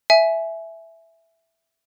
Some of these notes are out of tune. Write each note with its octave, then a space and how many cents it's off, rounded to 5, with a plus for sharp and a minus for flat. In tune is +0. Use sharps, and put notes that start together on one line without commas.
E5 +0 G#5 +20